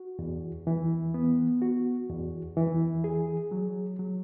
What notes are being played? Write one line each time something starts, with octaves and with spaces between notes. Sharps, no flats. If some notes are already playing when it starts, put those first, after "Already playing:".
Already playing: F#4
E2
E3
B3
F#4
E2
E3
G#4
F#3
F#3